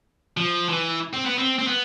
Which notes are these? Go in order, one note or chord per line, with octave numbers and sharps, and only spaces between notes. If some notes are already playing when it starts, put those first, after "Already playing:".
F3
E3
C4
B3
C4
C4
B3